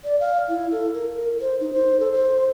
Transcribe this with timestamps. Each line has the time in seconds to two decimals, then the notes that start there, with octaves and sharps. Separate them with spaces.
0.04 D5
0.20 F5
0.49 E4
0.72 A4
0.94 A#4
1.41 C5
1.60 D#4
1.73 C5
2.00 A4
2.12 C5